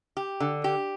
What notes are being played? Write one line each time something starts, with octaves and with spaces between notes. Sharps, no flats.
G4
D3
G4